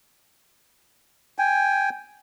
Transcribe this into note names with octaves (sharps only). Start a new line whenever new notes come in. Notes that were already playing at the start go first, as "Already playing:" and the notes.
G5 G#5